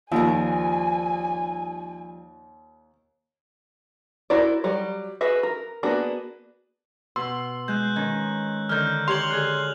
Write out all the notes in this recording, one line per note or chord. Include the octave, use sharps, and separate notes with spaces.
D#2 D#3 F3 G3 A#4 G#5
E4 F#4 A#4 C5 D5
F#3 G3
F#4 G#4 B4 E5
A#4
A#3 B3 D4 F#4 G#4
B2 C6 E6
G#3 F#6 G6
D#3 C#4
D3 D#3 F6 G6
G4 C#5 C6 C#6 F7 F#7
D3 G#4 F#6